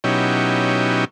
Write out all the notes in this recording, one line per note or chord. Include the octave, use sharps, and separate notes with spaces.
B2 F#3 C#4 D#4 E4 G4